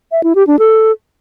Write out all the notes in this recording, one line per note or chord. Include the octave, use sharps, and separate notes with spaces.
E5
E4
G4
D4
A4